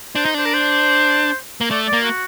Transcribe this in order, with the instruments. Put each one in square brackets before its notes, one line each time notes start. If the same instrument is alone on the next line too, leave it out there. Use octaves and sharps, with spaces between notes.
[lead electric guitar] D4 [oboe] C5
[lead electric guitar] D#4
[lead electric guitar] D4 [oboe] C5
[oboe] A#4
C5
[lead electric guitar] A#3
[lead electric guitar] A3 [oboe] D5
[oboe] D5
[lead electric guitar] A#3
[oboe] F#4